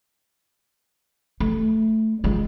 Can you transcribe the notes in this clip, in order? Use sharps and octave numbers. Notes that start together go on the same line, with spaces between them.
A3
G#3 F4